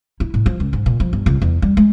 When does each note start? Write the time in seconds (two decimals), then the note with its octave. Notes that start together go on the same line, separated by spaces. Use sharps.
0.20 E4
0.34 A2
0.46 F3
0.60 C#2
0.73 G#2
0.86 A#2
1.00 F3
1.13 G1
1.26 C#2
1.42 E2
1.62 G3
1.77 G#3